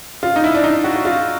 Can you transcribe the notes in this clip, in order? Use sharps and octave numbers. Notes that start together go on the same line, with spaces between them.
F4
D#4
E4
D4
D#4
F#4
F#4
F4